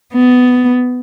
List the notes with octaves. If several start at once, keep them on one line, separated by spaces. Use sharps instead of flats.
B3